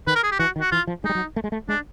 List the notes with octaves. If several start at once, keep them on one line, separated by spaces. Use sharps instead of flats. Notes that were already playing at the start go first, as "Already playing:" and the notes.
D#3 B4
A#4
G#4
G4
E3 F#4
D#3
F#4
E3 F4
F3
G#3 D#4
G3
F#3
A3
G#3
A3
G#3 D4